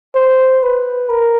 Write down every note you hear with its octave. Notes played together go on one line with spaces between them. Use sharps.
C5
B4
A#4